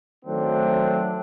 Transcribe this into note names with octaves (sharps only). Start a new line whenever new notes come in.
D#3 F#3 A3 C4 D4